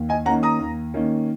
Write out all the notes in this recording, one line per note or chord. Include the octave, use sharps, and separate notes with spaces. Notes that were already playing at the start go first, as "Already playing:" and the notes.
Already playing: D#2
D#5 G#5
D#3 A#3 C#4 F#5 A#5
A#5 D#6
D#2
D#3 A#3 C#4